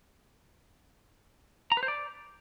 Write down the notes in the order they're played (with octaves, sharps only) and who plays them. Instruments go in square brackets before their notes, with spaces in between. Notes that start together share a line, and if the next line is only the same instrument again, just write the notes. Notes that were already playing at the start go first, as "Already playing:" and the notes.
[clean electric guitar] A#5
B4
C5
D5